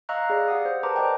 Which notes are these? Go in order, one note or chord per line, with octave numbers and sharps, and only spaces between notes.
D#5 F5 A#5 C#6 E6 F#6
G#4 D5 F5
G4 F#5 D#6
C5
A#4 B4 A5 A#5 C6 D6
C5 D5 D#5 G5